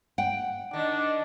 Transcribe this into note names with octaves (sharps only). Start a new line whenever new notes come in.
F#5 G5
D#3 D4